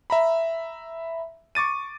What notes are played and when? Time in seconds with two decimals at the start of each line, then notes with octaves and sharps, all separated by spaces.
0.10 E5 A#5 B5
1.55 C#6 D6 A6 D#7